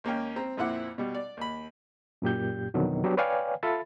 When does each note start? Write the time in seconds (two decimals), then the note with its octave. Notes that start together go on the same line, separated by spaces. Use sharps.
0.04 D#2 A#3 C#4 G5
0.36 C4 A#5
0.57 F2 A#2 C4 E4 F#5 D6
0.98 B2 G3
1.15 D5
1.37 D#2 B5
2.22 F#2 A#2 G4 G6
2.74 F2 B2 D3 D#3 F#3
3.04 F#3 B3 D4 G4
3.17 B4 C#5 D5 F5 G5 G#5
3.63 F4 A4 E5 B5 A6